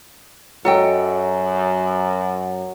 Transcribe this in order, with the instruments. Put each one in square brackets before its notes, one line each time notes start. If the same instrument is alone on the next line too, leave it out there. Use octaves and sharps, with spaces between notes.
[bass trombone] F#2 [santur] F#3 [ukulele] A4 D#5 G5